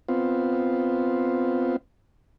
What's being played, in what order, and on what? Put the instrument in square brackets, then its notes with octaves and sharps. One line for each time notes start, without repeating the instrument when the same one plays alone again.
[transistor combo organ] B3 C4 F4